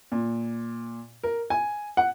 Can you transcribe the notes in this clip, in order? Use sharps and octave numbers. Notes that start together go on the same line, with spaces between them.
A#2
A#4
G#5
F#5